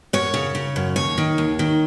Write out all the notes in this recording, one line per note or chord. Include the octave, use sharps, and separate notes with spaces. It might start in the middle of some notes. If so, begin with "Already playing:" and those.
F#2 C#5
C#3
C#3
F#2
D#2 C#5
D#3
D#2
D#3